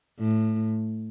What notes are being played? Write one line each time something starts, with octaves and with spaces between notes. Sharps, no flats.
A2